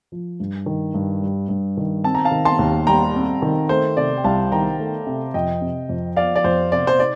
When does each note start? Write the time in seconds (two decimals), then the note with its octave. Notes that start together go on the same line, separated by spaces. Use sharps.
0.12 F3
0.40 G2
0.66 D#3
0.94 G2
1.22 G3
1.49 G2
1.77 D#3
2.04 C4 A5
2.15 A#5
2.25 F5 A5
2.31 D#3
2.45 A5 C6
2.59 D#2
2.87 G3 G5 A#5
3.15 C4
3.42 D#3
3.69 A3 C5
3.96 C3 D5
4.17 G5
4.24 C2 F5 A5
4.52 D#3 G5 A#5
4.79 A3
5.07 C3
5.34 F2 D#5 G5
5.61 C3
5.89 F2
6.16 F3 D5 F5
6.36 D5
6.44 F2 C5
6.72 C3 D5
6.87 C5
6.99 D#4 D5